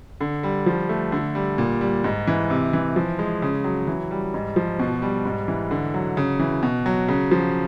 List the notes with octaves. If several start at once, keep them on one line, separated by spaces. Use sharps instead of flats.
D3
G3
F3
A3
D3
G3
A#2
G3
G#2
E3
C3
E3
F3
G#3
C#3
F#3
E3
G3
G#2
F3
B2
G3
G#2
E3
D3
F#3
C#3
E3
B2
F#3
C#3
F3